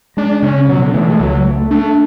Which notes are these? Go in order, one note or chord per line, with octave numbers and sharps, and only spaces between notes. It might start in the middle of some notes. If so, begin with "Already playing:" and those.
G#3 D4
C#3 C#4
B2 F#3
D3
E3 A3
G#3
C#2 F#3
A3
A3 D4